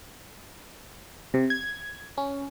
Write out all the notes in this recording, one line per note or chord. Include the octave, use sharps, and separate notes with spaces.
C3
G#6
C#4